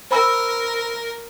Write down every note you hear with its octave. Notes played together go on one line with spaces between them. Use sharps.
A#4 C5 B5 E6